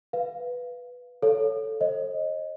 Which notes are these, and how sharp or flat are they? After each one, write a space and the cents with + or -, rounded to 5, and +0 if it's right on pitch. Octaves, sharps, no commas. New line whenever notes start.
B4 +0 F5 +0
A4 +5 C#5 +0 F5 +0
C5 +45 D#5 +0